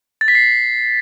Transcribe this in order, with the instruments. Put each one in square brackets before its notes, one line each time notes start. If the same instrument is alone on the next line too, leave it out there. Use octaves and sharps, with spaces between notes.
[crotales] A6
B6
C7